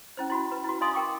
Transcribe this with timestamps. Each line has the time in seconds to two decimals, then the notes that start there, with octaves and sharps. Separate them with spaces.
0.17 C#4 E4 C5
0.30 E4 F#4 B5
0.52 B4
0.64 E4 F#4
0.81 D#4 D#5 F5 G#5 C6 D#6
0.94 A#4 G5 C#6 D6